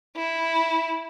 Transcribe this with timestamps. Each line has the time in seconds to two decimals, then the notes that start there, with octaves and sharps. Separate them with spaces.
0.16 E4